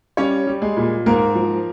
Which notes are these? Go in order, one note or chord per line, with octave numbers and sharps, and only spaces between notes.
G3 C#4 C#5
G3
G#3 G#4
A#2
G#2 A#3 A#4
F3